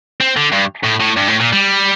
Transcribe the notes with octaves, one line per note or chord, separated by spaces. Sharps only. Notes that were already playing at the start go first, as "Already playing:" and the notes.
C4
D3
G2
A2
A2
G2
A2
A#2
G3